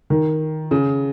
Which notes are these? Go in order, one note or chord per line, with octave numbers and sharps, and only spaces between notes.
D#3
C#3